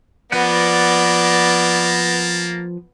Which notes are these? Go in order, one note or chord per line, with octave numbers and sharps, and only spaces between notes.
F3 A#3 B3 A#4 B4 D5 F#5 A5